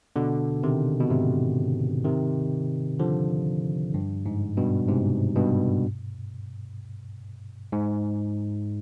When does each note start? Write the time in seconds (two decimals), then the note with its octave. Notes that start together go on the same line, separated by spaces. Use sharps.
0.16 B2 D3
0.63 C3 D#3
1.00 B2
1.10 G#2 C3
2.05 C3 D#3
2.99 D3 F3
3.94 G2
4.26 G#2
4.57 G2 B2
4.88 G#2 C3
5.36 G2 B2
7.72 G#2